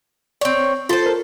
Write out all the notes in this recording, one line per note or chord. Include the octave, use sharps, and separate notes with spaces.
C4 C#5 D5
F4 A4 C5 C6
A#4